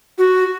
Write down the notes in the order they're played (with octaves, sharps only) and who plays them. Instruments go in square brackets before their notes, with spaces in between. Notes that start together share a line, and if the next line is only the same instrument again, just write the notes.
[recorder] F#4